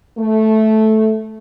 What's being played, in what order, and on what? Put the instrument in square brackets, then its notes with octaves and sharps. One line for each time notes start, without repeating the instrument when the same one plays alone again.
[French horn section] A3